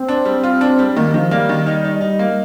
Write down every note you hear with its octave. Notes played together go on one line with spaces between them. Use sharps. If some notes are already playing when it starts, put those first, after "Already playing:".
Already playing: C4
D4
G3
F4
D4
G3
D#3 A#3
D#3 F3
G3 A#3
D#3
D#4
D#4
D#4
A#3